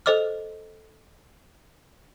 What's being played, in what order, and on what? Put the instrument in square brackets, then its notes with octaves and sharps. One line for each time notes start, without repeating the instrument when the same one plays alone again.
[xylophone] A4 C5 D#5 D6 F6